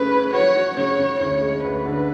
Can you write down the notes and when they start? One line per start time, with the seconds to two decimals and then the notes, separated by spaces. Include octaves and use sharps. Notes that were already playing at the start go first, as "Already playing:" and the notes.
Already playing: C#3 A3 C#4 B4
0.11 C#4
0.33 F#4 C#5
0.55 F#4
0.77 C#3 C#5
0.99 C#3
1.20 D2 C#5
1.41 G#3
1.63 D2 B4
1.86 D3